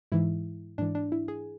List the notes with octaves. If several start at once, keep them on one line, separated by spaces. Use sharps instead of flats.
G#2 E3 E4
G#2 E3 D4
D4
E4
G#4